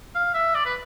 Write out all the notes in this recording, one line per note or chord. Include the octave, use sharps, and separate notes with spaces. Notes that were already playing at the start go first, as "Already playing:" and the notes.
F5
E5
D5
B4